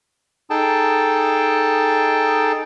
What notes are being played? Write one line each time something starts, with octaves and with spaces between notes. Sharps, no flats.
D#4 G#4 A4 G5 A5